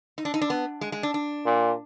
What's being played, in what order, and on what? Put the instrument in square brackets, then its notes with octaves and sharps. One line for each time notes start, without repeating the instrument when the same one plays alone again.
[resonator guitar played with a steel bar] D#4
D4
D#4
D4
B3
G#3
G#3
D4
D4
[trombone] A#2